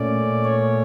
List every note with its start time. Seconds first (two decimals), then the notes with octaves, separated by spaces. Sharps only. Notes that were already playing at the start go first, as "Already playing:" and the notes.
Already playing: A#2 A3 C#4 D5
0.45 C#5